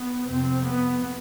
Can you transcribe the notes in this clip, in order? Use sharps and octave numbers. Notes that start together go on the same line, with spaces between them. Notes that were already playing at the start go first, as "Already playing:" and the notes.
Already playing: B3
F2 C3 C4
B3